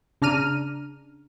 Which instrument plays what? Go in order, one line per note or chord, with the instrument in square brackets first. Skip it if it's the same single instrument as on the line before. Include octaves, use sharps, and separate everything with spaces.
[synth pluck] C#3 D4 A#5 F6 D#7